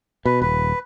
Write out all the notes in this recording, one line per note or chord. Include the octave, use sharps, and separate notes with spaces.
B2 B4
D#1 B4